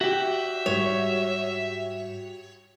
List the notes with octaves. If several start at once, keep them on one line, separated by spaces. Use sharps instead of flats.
F#4 G4 E5
G#2 G3 C#5